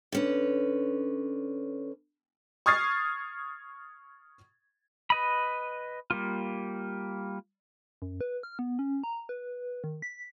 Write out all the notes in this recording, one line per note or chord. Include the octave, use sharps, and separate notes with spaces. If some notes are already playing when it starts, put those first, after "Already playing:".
D3 C#4 B4
C#6 D#6 F6 G#6 A6 C7
B4 D#5 B5
G3 A#3 F4
F#2
B4
F6
B3
C#4
A#5
B4
D#3
B6